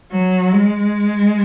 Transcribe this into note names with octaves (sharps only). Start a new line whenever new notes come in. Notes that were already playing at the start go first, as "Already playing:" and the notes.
F#3
G#3